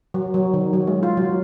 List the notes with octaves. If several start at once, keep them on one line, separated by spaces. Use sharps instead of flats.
F#3
F#3
D#3
F#3
G#3
F4
F#3